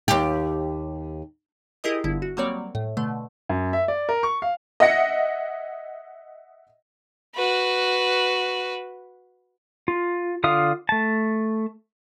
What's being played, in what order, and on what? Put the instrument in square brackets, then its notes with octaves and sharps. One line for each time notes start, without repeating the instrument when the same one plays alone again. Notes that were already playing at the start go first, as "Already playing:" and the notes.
[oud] D#2 G4
[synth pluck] E4 G4 G#4 A#4 D#5 D#6
G1 D3 E4
F#4
F#3 G3 A#3 C4 C#5 D5
A2
B2 D3 A3
[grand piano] F#2
E5
D5
A#4
C#6
F5
[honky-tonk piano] D#5 E5 F#5 A#6 C#7
[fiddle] F#4 B4
[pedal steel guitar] F4
D3 F4 F5 D#6
A3 A5